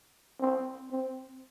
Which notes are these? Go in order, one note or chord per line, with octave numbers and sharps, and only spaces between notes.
C4
C4